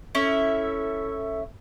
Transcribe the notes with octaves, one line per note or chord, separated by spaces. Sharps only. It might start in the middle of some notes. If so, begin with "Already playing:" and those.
C#4 E4 A4 E5